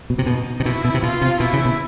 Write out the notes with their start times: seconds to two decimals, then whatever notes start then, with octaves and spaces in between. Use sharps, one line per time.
0.10 B2
0.19 C3
0.26 B2 D#4
0.60 C3
0.65 B2 E4
0.85 B2
0.94 C3
1.03 B2 F4
1.22 C3
1.40 B2 E4
1.53 C#3
1.65 B2